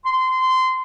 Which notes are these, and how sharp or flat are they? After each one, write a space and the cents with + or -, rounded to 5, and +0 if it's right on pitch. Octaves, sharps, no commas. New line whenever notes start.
C6 -20